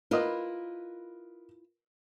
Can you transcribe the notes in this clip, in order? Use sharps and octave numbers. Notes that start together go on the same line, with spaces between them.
E4 F4 A#4 B4 D#5